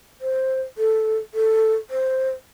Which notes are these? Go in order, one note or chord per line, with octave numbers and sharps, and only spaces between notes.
C5
A4
A4
C5